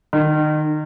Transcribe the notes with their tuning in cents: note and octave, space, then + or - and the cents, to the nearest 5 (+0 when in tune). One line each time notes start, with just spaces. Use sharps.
D#3 -30